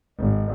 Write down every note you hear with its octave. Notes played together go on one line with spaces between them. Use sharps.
G#1